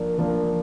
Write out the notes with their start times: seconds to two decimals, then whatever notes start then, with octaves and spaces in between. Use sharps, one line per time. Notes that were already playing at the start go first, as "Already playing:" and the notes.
Already playing: F3 A#3 D4
0.18 F3 A#3 D4